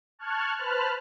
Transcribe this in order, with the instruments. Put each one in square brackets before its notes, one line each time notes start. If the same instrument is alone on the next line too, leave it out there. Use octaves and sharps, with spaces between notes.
[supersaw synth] A5 C#6 F6 F#6 G#6
B4 C5 A5 B5 F6 F#6